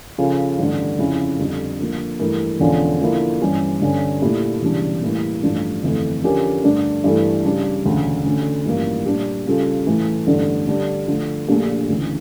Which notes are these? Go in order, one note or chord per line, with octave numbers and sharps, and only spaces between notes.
C#3 F3 C#4 F4 A4
A1 G2 D3
F2 C#3 F3 C#4 E4
F2 D3 G3
D3 F3 A#3
G2 E3 A3 E4 A#4
E1 E2 D3 F3 C#4
D3 F3 A#3 E4
G2 E3 G3 C#4 G4
G1 G2 D3 G3 C#4
A#2 A3 E4 G4
E1 E2 C#3 G3 D4
A2 E3 G3 A#3 E4
A1 G2 F3 A3 D4
G1 F2 E3 A3
D3 F3 C#4 G4 A#4
G2 D3 A3 D4
G2 E3 A3 E4 A4
C#3 G3 D4
E1 D2 C#3
D2 D3 A3 C#4
A1 G2 F3 A#3 E4
A#2 G3 D4 G4
C#3 G3 C#4 F4 A4
A2 E3 A3
A1 G2 D3 A3
D3 G3 D4
D3 F3 A3
A#1 A#2 A3 D4 G4
D2 C#3 E3